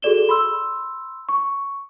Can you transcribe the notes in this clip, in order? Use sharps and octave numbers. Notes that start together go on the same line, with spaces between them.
F#4 G#4 A4 D5 E7 G7
B5 C6 E6
C#6